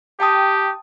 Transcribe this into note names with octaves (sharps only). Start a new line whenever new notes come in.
G4 G5 A5 D#6